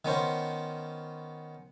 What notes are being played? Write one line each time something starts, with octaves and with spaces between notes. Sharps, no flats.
D#3 B3 C#4 C5